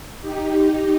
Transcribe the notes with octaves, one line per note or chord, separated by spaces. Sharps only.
D#4 G4